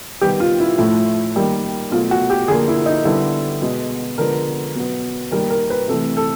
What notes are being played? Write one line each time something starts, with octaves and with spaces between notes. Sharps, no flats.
D#3 G3 B3 G4
F4
E4
A2 F3 A3 E4
D#3 G3 A#3
B2 F#3 A3 F4
F#4
G4
D3 F3 A#3 G#4
E4
D#4
D3 G3 B3 E4
B2 G#3 B3
D3 F3 G#3 B3 A#4
B2 F#3 B3
D#3 G3 A#3 A#4
A#4
B4
C3 E3 A3 A4
A4